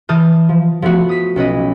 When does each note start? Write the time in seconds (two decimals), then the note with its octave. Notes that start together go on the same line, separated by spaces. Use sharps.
0.09 E3 A5 D#6 F6 G6
0.49 F3
0.82 F3 A3 B3 F#4
1.09 D#6 B6
1.36 B1 C#4 B4 D#5